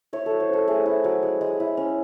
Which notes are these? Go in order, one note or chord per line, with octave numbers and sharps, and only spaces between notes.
E4 C#5
A4
F#3
C5
C#4 A4
A3 G#4
E4
F#3
G#3
G#3
E4
C#4